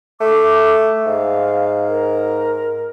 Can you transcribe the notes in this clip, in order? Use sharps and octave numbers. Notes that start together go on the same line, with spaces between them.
A3 D6
G#2 F5
A#4